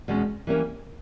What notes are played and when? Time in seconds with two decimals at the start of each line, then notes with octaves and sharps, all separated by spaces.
0.08 E2 B2 G#3 C#4
0.47 E3 G3 A#3 C#4